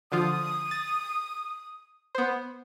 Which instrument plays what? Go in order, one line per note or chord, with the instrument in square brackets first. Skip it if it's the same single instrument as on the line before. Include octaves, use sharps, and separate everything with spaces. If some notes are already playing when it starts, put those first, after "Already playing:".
[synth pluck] D3 F3 F4 [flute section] D#6
[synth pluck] A6
B3 C5